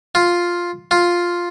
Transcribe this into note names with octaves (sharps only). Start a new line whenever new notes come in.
F4
F4